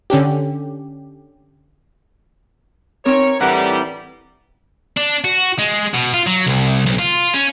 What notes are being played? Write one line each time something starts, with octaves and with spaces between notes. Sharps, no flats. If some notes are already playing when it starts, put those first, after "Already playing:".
D3 C#4 D4 G4
C4 D#4 A#4 C#5
A2 E3 G3 D4 A#4 F#5
D4
F#4
G#3
B2
F4
F#3
C2
B1
F4
C#4